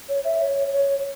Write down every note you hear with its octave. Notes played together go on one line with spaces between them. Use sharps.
C#5
E5
C#5
C#5